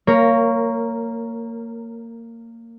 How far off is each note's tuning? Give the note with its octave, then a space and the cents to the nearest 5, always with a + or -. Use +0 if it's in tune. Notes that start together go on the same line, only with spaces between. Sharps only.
A#3 -20 A#4 +0 C#5 +10